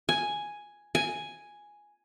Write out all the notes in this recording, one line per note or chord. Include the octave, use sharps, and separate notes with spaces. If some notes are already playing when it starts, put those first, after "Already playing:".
G#5
G#5